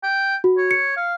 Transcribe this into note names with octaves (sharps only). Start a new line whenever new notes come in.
G5
F#4
C#5
C#7
F5